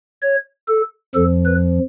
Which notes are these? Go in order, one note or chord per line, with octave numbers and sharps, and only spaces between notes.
C#5
A4
F2 F3 A4
B4